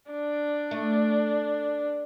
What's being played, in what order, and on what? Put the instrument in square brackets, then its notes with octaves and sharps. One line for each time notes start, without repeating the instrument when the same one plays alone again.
[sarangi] D4
[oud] A3